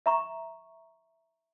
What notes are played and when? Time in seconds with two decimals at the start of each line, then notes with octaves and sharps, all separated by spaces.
0.06 E5 A#5 C#6